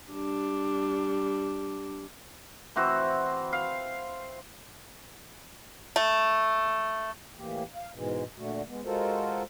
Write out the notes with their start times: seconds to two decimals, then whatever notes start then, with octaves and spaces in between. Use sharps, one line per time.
0.13 G3 D4
2.76 E3 C4 F#4 C5
3.53 F5
5.96 A3
7.37 A2 E3 A#3 G4
7.75 F5
7.95 G#2 B2 E3 G#3
8.38 A#2 D3 A3 F#4
8.68 G#3 B3
8.85 G#3 F4 F#4 A4 A#4 C5